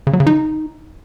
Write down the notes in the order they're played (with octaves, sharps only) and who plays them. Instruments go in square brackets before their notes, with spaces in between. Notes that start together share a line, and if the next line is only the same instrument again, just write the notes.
[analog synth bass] C#3
F#3
C#3
D#4